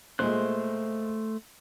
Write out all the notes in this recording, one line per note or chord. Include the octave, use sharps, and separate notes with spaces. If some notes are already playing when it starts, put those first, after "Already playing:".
A#2 G#3 A3 C5 F#6